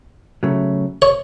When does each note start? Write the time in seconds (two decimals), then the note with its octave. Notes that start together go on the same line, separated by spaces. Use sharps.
0.43 C#3 F#3 A3
1.02 C#5